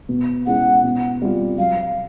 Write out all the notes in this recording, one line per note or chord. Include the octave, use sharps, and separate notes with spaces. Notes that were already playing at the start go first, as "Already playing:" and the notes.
B2
G#3 C#4 E4 F#5
B2
G3 C4 F4
F#3 F5